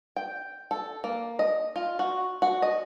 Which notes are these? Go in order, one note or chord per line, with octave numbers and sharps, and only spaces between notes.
G5
A4
A#3
D#5
F4
F#4
F#4
D#5